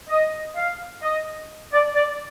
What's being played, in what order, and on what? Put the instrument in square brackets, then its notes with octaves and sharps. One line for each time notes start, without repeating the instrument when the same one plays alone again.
[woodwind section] D#5
F5
D#5
D5
D5